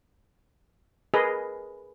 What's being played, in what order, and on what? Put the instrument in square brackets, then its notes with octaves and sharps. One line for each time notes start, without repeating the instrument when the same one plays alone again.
[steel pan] G#4 A#4 B4 D#5